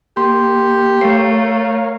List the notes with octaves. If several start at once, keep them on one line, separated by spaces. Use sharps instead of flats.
A#3 G4 C6
A3 A#4 C#5 F5 C7